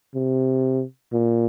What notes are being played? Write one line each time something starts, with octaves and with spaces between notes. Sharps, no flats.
C3
A#2